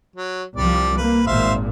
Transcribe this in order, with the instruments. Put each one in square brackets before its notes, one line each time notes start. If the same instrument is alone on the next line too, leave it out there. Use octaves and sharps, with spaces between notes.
[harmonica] F#3
[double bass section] C2 F3 [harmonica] G3 D5
[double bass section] A#3 [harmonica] B4
[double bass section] G#1 A#2 [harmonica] C5 E5 F5